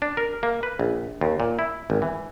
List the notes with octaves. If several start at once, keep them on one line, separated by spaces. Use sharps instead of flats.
D4
A#4
A#3
B4
A#1
D#2
A#2
E4
G#1
E3